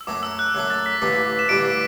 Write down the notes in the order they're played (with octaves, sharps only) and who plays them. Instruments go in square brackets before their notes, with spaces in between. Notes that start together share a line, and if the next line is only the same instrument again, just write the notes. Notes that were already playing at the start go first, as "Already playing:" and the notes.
[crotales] E6
[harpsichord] F#2 F#3 A3 [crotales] D6
[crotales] E6
F#6
[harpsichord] F#2 F#3 A3 [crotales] F#6
[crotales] A6
B6
[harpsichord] A1 G2 D3 G3 [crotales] C7
[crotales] E7
[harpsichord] A1 G2 D3 G3 [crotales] D7
[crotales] B6